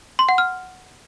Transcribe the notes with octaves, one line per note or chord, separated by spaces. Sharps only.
C6
F#5
F6